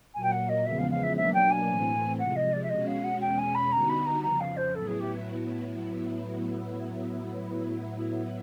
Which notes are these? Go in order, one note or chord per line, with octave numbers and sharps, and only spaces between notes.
A#2 F#3 A#3 G#5
G5
F#5
D#5
E2 C#3 F3 G#3 B3 E5
F5
F5
E5
B2 F#3 A#3 D4 E5
G5
G#5
A2 E3 A3 C4
C3 F3 G#3 F#5
D#5
D5
E5
B2 G#3 C#4 F#4 D#5
F5
F#5
E2 B2 G#3 C#4 G5
G#5
B5
D3 G3 B3 D#4 F#4 A#5
B5
A#5
F2 C#3 F3 A#5
F5
C5
A2 F#3 B3 E4 A4
G#4
G4